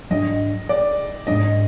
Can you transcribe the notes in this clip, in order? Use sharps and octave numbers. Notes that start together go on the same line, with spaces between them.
G#2 F#3 D4 D#5
D5
G#2 F#3 D4 D#5